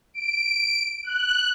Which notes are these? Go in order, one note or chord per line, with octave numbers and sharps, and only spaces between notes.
D7
F#6